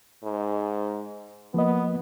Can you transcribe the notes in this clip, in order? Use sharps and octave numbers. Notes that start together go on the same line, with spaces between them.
G#2
F3 A#3 B3 D#5